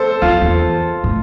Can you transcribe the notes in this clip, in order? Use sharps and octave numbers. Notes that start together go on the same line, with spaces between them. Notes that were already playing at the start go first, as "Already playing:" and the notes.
Already playing: A4 C5
E2 F4
E2
A2